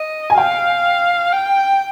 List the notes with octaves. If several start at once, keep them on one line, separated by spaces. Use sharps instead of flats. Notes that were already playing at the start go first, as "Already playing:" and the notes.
Already playing: D#5
G#5
F5 G5
G5